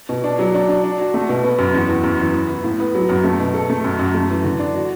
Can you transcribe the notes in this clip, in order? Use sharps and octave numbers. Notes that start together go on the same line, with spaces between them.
B2
D4
F#3
D4
D4
D4
F#4
A3
B2
B3
F#2
E2
E2
F#2
E3
B3
E3
A2
B3
F#3
F#2
A3
B2
A4
A3
F#2
F#2
A3
E3
D3
D4
F#4